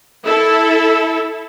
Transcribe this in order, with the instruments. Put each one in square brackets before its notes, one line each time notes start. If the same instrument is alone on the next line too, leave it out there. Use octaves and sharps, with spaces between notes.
[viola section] E4 A4